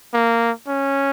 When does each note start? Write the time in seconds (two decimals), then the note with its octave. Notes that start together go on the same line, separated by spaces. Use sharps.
0.14 A#3
0.68 C#4